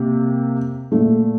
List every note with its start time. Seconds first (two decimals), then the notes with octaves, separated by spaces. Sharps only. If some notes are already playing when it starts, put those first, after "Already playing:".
Already playing: C3 A#3
0.92 A#2 A3